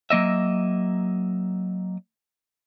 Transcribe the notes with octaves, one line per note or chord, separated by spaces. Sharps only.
F#3 A#3 D#5 E5